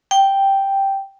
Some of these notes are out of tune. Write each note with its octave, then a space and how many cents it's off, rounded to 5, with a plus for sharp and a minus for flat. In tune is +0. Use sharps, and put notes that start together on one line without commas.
G5 +0